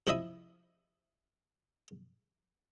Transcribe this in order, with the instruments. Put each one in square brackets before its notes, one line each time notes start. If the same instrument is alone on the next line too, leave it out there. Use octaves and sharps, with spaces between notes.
[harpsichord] C3 F3 E4 D#5 E5 D#6